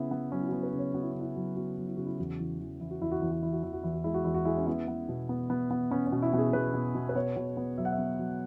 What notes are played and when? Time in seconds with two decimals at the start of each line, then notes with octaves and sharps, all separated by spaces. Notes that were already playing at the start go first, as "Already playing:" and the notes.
Already playing: C#3 B3 E4
0.11 B3
0.32 F#3 C#4
0.41 E4
0.48 B3 F#4
0.63 B4
0.73 C#3
0.79 C#5
0.94 B3 F#4
1.03 E4
1.12 C#3 C#4
1.21 E4
1.36 F#3
1.56 B3 F#4
1.78 F#3
1.87 E4
1.97 C#3 F#4
2.06 E4
2.18 E2 F#4
2.39 E3
2.60 E3
2.80 E3 E4
2.91 F#4
3.01 E2 E4
3.12 F#4
3.21 E2 E4
3.32 F#4
3.43 E3 E4
3.53 F#4
3.63 E2 E4
3.73 F#4
3.83 E2 E4
3.94 F#4
4.04 G#3 E4
4.14 F#4
4.24 E2 E4
4.34 F#4
4.45 G#3 E4
4.57 C#4
4.66 B3 E4
4.88 B3
5.09 B2
5.29 B3
5.50 B3
5.71 B3
5.91 B3 C#4
6.07 C#4
6.12 B2
6.22 E4
6.33 B2 G#4
6.53 B2 B4
6.74 B2
6.95 B2
7.09 B4
7.16 B3 C#5
7.36 B2
7.57 B3
7.78 F#3 E5
7.85 F#5
7.92 E5
7.99 B3
8.19 F#3